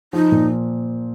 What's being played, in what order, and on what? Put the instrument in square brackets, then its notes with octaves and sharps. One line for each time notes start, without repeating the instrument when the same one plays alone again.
[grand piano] F3 [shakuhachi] D#4
[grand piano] A#2